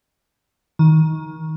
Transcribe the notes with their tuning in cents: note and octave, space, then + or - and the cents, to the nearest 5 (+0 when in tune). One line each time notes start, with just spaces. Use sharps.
D#3 +25